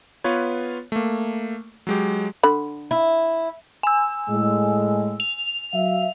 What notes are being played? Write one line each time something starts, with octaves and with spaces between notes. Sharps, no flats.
B3 F4 B4 C#5
A3 A#3
F#3 G#3 G4
D3 B5
E4
G#5 E6
A2 G#3
F7
F#3 E5 F5